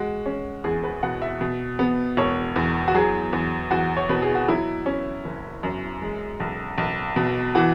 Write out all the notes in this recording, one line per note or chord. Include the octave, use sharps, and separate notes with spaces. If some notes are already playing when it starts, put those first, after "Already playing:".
Already playing: G#3 F#4
C#4
E2 G#4
B4
B2 F#5
E5
B2
B3
E1 C#5
E2
F#4
F#3 G#4
E2
E2 F#4
C#5
B2 B4
G#4
F#4
F#3 E4
C#4
F#1
F#2
G#3
B1
B1
B2
E3 F#4